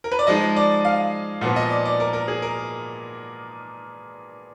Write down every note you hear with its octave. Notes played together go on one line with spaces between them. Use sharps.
A#4
B4
D5
F3 G#3 D#4 D#5
D5
F5
A#2 F3 B3 F#5
D#5
D5
D5
A#4
A#4
G#4
A#4